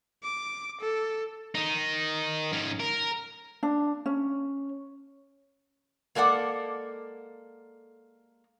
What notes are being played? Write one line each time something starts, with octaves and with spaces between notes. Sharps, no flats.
D6
A4
D#3 D#4
G#2 C#4
A#4
D4
C#4
G#3 A#3 A4 D5 F#5